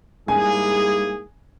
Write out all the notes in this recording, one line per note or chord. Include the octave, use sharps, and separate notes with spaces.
G#2 G3 A#3 E4 G#4 G#5